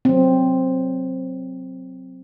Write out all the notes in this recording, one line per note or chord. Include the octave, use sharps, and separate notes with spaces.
F#3 C4